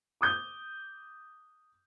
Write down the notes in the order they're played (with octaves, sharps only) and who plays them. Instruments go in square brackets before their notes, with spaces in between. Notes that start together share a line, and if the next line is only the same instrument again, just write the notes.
[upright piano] D6 D#6 G6